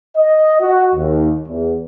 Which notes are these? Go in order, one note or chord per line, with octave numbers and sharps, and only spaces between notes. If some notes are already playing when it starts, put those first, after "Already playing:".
D#5
F#4
D#2
E2